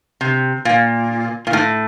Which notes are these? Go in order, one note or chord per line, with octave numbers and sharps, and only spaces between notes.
C3
A#2
A#2
A2